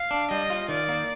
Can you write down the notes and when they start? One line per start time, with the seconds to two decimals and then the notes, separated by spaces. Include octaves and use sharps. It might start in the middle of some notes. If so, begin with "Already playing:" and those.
Already playing: F5
0.11 D4
0.30 G3 D#5
0.50 F4
0.68 D#3 D5
0.88 A#3